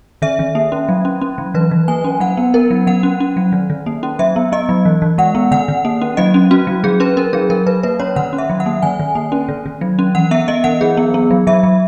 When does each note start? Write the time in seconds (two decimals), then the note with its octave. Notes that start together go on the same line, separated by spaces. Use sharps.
0.22 D#3 E5
0.39 D#3
0.55 A#3
0.72 C#4
0.89 F#3
1.05 C#4
1.21 C#4
1.38 F#3
1.54 E3 B4
1.71 E3
1.88 A#3 G#5
2.04 C#4
2.20 F#3 F#5
2.37 B3
2.54 B3 A#4
2.71 F#3
2.87 F#3 F#5
3.03 C#4
3.20 C#4
3.37 F#3
3.52 D#3
3.70 D#3
3.86 A#3
4.03 C#4
4.19 F#3 E5
4.36 B3
4.52 B3 D#5
4.69 F#3
4.85 E3
5.02 E3
5.18 G#3 F#5
5.35 B3
5.51 D#3 F#5
5.68 D#3
5.85 A#3
6.01 C#4
6.17 F#3 D#5
6.34 C#4
6.51 C#4 F#4
6.67 F#3
6.84 F#3 G#4
7.00 C#4 B4
7.17 C#4 A#4
7.33 F#3 G#4
7.50 F#3 A#4
7.66 F#3 B4
7.83 A#3 B4
7.99 C#4 C#5
8.16 D#3 F#5
8.33 C#4
8.38 E5
8.50 F#3
8.60 F#5
8.66 A#3
8.82 D#3 G#5
8.99 D#3
9.15 A#3
9.32 C#4
9.49 D#3
9.66 D#3
9.81 F#3
9.99 C#4
10.15 E3 F#5
10.31 B3 E5
10.48 B3 D#5
10.64 E3 F#5
10.81 F#3 G#4
10.97 B3
11.14 B3
11.31 F#3
11.47 F#3 E5
11.63 F#3